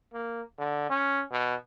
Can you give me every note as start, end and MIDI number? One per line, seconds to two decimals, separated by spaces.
0.14 0.42 58
0.58 0.87 50
0.90 1.23 61
1.31 1.55 47